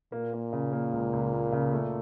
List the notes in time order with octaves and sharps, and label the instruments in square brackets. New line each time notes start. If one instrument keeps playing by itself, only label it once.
[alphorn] A#2 [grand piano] A#3
[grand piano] A#3
C#3
A#3
C#2
C#2
A#3
C#3
A3